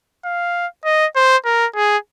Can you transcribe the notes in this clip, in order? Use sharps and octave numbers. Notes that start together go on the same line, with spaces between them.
F5
D#5
C5
A#4
G#4